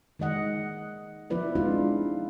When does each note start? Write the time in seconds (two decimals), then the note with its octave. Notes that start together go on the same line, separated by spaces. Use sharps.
0.19 D#3 G#3 D#5 F#5
1.30 F3 B3 E4 B4 D5
1.55 G#3 C4 D4 D#4 F4